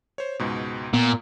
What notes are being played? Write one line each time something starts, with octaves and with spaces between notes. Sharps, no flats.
C5 C#5
C#2 G#2 B2
A#2 B3